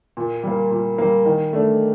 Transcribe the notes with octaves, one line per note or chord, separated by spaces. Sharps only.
A#2
G3 A#3
A#2
G3 A#3
D#3
A3 D4